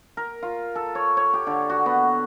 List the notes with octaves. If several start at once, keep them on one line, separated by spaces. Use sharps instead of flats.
A#4
F4
A4
C#5
C#5
G4
D3
F#4
B3